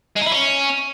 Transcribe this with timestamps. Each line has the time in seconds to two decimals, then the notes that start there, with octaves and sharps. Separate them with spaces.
0.16 G#3
0.21 D#4
0.26 E4
0.32 C#4